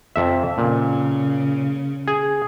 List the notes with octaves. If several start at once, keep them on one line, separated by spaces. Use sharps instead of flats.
F2 E5
A#2 C#3
G#4